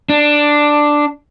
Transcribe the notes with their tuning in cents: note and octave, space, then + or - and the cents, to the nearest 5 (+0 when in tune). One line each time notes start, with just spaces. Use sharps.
D4 +5